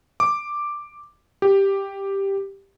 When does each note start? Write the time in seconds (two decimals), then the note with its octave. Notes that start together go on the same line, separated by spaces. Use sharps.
0.20 D6
1.42 G4